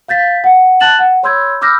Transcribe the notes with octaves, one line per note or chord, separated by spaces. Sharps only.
F5 G6 A6 B6
F#5
A5 F#6 A6 E7 F#7
F#5
C#5 B5 C6 E6 G6 G#6
B5 D6 E6 F6 G6 A#6